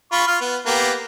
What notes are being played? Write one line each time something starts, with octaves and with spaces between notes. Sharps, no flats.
F4 B5 C#6
F4 F6
B3
A#3 B3 G4